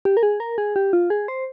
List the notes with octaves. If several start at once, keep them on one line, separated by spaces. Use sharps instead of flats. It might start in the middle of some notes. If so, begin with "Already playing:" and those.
G4
A#4
G#4
A#4
G#4
G4
F4
G#4
C5